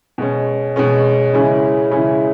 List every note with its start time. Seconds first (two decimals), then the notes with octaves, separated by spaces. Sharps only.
0.18 B2 G#3 C#4
0.76 B2 G#3 C#4
1.34 C#3 E3 G#3 C#4 E4
1.91 C#3 E3 G#3 C#4 E4